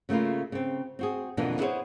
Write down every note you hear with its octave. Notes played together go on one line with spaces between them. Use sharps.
C#3 A3 A#3 E4 F4
C#3 C4
C4 F#4 G#4
F2 B2 D3 E3 A#3 D4
B3 E4 G#4 A4 C5 C#5